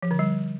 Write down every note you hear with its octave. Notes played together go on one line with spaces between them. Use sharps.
F3
D3
G3